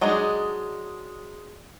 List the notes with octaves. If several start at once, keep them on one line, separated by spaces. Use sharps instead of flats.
F#3 G#3 D4 D#4 G#4